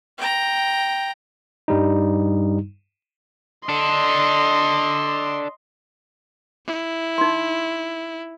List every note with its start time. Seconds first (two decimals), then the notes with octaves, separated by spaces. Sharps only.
0.18 G5 A#5
1.68 G2 G3 D#4
3.69 D4 A4 D#5 C6
6.66 E4
7.18 D#4 C6